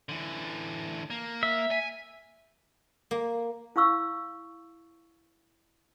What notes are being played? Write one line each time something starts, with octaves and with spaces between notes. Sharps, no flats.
D3 E3
A#3
E5
G#5
A#3
E4 F5 C#6 E6